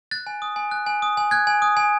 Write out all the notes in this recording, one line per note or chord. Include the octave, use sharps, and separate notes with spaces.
F#6 A6
G#5
D#6
G#5
F#6
G#5
D#6
G#5
F#6 G#6
G#5
D#6
G#5